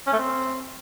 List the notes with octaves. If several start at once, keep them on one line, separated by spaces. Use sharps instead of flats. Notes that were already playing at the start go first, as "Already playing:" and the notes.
C#4
A3
C4